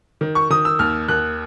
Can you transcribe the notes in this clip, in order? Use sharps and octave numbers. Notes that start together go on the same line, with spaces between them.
D#3
C#6
D#3 D#6
E6
D#2 F6
D#2 F#6